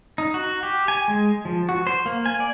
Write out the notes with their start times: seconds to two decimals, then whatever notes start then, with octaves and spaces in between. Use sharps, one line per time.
0.18 D#4
0.34 F#4
0.63 G4
0.88 G#5
1.08 G#3
1.45 F3
1.69 F#4
1.87 C5
2.06 A#3
2.26 G#5
2.40 D5